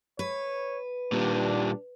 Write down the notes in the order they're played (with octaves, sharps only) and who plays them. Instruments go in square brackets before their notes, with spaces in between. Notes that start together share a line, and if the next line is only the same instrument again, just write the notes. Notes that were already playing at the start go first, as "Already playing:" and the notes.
[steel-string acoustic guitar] B4 [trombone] C#5
[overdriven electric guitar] A#2 G3 [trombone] D4